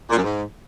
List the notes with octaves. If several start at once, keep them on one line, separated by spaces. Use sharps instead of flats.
A#2
F#2
G#2